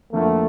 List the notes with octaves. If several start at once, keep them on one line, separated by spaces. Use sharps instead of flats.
F2 D3 F3 A3 A#3 E4